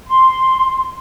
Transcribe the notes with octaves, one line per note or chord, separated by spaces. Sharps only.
C6